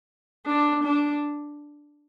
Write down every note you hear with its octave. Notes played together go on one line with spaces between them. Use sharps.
D4
D4